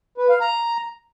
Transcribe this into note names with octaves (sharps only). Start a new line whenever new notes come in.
B4
F5
A#5